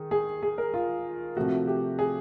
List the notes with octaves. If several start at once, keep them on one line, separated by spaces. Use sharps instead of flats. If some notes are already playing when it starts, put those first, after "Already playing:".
Already playing: D#3 G#4
G#4
G#4
A#4
F4
C3 F3 A3 F#4
G4
G#4